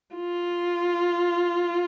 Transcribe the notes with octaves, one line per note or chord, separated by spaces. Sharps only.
F4